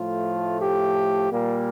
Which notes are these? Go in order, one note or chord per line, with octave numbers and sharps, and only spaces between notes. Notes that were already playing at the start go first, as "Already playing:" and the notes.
Already playing: A2 F3 A3 F4
G4
A#2 G3 A#3